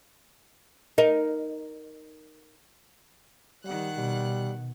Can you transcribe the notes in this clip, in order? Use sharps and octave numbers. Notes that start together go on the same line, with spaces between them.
D#4 A#4
D#3 G3 F#5 F#6
B2 G3